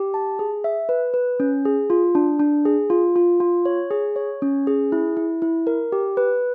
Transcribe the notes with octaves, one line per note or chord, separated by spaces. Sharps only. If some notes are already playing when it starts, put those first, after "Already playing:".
Already playing: G4
A5
G#4
E5
B4
B4
C#4
G#4
F4
D4
D4
G#4
F4
F4
F4
C#5
G#4
C#5
C#4
G#4
E4
E4
E4
A#4
G4
B4